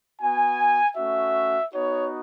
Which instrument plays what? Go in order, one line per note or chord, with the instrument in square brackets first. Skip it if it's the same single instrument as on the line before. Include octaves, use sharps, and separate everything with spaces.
[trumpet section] B3 F#4 G#5
A3 C#4 F#4 E5
B3 D#4 F#4 C#5